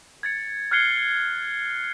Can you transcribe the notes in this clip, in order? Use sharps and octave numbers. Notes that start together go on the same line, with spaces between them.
G#6 A6 C#7
F6 F#6 G#6 C7 C#7 G7